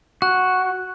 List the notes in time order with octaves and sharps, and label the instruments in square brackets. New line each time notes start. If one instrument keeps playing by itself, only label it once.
[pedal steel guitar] F#4 [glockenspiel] F#6